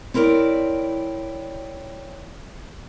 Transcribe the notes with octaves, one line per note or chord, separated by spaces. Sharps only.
C4 E4 A#4 C#5 D5